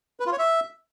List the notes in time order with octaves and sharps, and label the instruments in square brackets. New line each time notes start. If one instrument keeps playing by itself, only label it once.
[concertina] B4
F4
C#5
E5